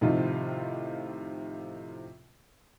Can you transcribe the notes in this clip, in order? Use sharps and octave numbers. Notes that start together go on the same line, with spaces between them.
A2 C3 D#3 F3 D#4 F4